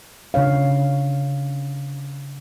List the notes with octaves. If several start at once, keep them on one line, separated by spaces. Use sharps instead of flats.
C#3 D4 C#5 F5